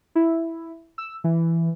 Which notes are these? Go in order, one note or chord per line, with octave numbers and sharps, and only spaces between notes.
E4
E6
E3